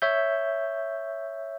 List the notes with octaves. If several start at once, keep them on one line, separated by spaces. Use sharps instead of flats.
C#5 E5 G6